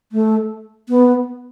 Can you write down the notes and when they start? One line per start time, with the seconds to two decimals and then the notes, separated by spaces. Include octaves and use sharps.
0.12 A3
0.89 B3